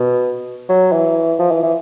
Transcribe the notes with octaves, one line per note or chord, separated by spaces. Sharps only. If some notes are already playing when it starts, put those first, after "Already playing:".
Already playing: B2
F#3
E3
F3
E3
E3